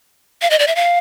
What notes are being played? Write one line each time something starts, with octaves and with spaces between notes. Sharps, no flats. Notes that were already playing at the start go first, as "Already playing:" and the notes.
F5
D#5
D5
E5
F5